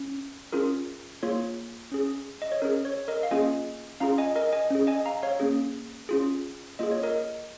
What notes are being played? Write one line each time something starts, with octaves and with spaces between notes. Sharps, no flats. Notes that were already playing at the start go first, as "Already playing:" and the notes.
Already playing: C#4
C#4 F4 G#4 A#4
A#3 F4 G#4 C#5
C#4 G#4
D#5
C#5
C#4 G#4 A#4
C#5
A#4 D#5
F5
A#3 C#4 F4 G#4 D#5 G#5
C#4 F4 G#4 F5 A#5
D#5 G#5
A#4 D#5
D#5 G#5
C#4 G#4
D#5 G#5
F5 A#5
C#5 F5
A#3 C#4 G#4
C#4 F4 G#4
A#3 F4 G#4 D#5
C#5
A#4 D#5